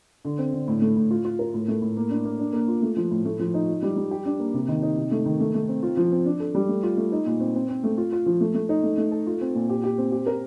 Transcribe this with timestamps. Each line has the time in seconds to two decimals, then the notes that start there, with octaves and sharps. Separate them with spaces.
0.25 D3
0.38 C4
0.53 D3
0.68 A2
0.82 A3
0.96 A2
1.11 F4
1.25 F4
1.39 A#4
1.54 A2
1.68 A3
1.82 A2
1.97 A#3
2.10 D4
2.25 A#3
2.39 D4
2.53 A#3
2.68 F4
2.82 A3
2.96 F3
3.11 A2
3.25 A3
3.39 F3
3.54 D#4
3.68 F4
3.82 G3
3.96 G3
4.11 G4
4.25 D4
4.40 A#3
4.54 C3
4.68 D#3
4.82 D#4
4.97 C3
5.11 A3
5.26 D#3
5.40 A3
5.55 A3
5.68 C4
5.83 F4
5.97 F3
6.12 C4
6.25 D4
6.40 A4
6.55 G3
6.68 A3
6.83 F4
6.97 A3
7.12 D#4
7.26 A#2
7.40 C4
7.55 C4
7.69 C4
7.84 A3
7.98 F4
8.12 F4
8.26 F3
8.41 A3
8.54 A3
8.69 D#4
8.83 A3
8.98 A3
9.11 A4
9.27 F4
9.41 C4
9.55 A#2
9.69 G4
9.84 G4
9.98 C4
10.12 G4
10.26 A#4